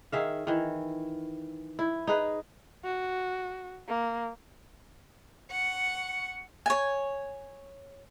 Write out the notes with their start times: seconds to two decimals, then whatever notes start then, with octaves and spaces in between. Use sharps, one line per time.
0.12 D#3 G#4 E5 F5
0.47 D#3 E3
1.79 E4
2.07 D#4 G#4 B4
2.85 F#4
3.89 A#3
5.51 F#5 C#6
6.66 C#5 G#5